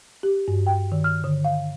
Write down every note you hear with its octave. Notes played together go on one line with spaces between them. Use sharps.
G4
G2
G5
D#3
F6
D3
F5